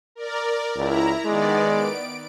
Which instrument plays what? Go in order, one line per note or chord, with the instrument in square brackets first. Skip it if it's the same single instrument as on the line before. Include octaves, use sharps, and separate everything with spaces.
[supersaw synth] A#4 D5
[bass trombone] C#2 [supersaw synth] E4 A#5
[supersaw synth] D#3 B3 D5 [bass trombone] G#3
[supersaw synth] D7